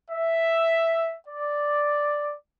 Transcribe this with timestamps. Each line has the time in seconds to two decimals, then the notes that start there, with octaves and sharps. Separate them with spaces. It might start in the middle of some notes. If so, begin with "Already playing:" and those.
0.11 E5
1.29 D5